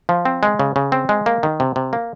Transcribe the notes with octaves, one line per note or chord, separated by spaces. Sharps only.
F3
C4
G#3
C#3
C#3
C4
G#3
A#3
D#3
C3
C3
A#3